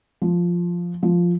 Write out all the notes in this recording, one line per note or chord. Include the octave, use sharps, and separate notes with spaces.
F3
F3